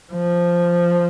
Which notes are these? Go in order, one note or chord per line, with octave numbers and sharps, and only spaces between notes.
F3